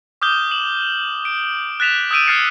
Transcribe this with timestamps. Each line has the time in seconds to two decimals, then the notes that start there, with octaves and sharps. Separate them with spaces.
0.22 D6 D#6 F6 G6 G7
0.51 E7 F#7
1.25 D7
1.80 F#6 A6 B6 E7 F7
2.11 D#6 E6 G6 D7 D#7
2.27 F6 G#6 A6 C7 C#7 E7